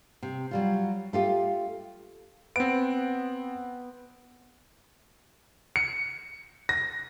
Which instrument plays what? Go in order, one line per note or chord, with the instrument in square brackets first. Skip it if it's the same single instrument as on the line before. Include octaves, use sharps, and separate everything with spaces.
[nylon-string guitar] C3
F#3 G3 F4
A3 F4 G4
[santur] B3 [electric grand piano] C4 D7
[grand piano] C#7
A#6